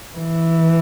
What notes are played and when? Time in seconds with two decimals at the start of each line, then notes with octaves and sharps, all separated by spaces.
0.16 E3